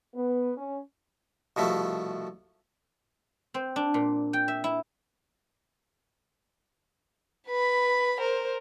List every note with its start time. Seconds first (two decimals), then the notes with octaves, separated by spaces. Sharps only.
0.15 B3
0.57 C#4
1.56 C2 B2 F3 A3
3.54 C4
3.76 D4
3.94 A#2
4.33 G5
4.48 E5
4.64 E4
7.48 B4 B5
8.20 A#4 C5